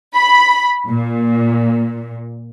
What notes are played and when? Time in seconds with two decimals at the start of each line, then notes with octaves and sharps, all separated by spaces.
0.16 B5
0.85 A#2